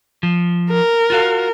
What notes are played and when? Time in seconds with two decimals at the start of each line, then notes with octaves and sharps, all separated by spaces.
0.23 F3
0.70 A#4
1.10 F4 F#4 F5